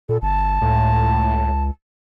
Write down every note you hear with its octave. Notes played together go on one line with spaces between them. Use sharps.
A#2 A4
G1 A5
C#2 A2